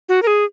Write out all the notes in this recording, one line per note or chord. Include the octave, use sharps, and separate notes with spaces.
F#4
A#4
G#4